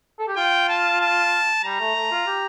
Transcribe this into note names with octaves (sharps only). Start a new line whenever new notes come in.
A4
G4
F4 G5
A5
A5
G3 A#5
A3
A3
F4
G4